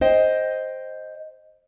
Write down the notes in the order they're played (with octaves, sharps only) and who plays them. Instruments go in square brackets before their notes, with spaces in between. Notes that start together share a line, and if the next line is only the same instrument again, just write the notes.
[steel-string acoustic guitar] C5 D#5 G5